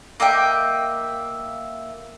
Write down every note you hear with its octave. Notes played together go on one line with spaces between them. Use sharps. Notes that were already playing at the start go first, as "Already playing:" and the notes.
A#3 D#5 E5 G5